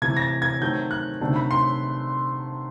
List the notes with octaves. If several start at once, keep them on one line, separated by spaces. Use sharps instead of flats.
C3 E3 A3 G#6
A#6
A6
G#6
D#3 F#3 A3 C4 G6
F#6
C3 D#3 F#3 A3 D4
B5
C6